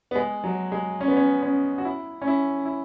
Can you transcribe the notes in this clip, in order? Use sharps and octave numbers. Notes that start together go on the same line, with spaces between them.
B3
G#3
F#3
G#3
C#4
B3
C#4
C#4
F#4
E4
C#4
E4
E4